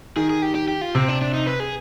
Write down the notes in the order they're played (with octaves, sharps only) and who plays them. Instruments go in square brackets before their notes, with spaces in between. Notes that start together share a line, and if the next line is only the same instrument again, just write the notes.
[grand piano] D#3 [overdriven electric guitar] G#4
[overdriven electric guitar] G#4
G4
G4
G4
F4
[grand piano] C3 [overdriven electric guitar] C4
[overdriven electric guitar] D4
D4
D#4
B4
G#4